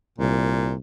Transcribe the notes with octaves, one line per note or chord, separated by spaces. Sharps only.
C2 A#2